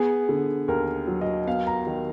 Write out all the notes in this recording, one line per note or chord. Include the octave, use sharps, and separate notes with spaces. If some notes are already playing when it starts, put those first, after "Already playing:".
Already playing: B3 G#4
D3
D#2 A#4
F#3
D#5
B3 F5
A#5
D#3